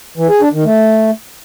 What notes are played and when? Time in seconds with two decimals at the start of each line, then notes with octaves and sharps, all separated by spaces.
0.17 E3
0.29 G#4
0.41 D4
0.53 D#3
0.65 A3